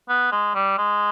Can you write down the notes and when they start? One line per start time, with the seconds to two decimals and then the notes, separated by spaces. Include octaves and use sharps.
0.09 B3
0.32 G#3
0.55 G3
0.78 G#3